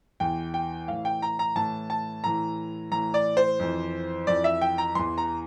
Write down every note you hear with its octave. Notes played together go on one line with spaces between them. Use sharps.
E2 E3 G5
G5
A2 E3 F5
G5
A#5
A#5
A2 E3 A5
A5
A2 E3 A#5
A2 E3 A#5
D5
C5
F2 E3
F2 E3 D5
E5
G5
A#5
E2 E3 C6
A#5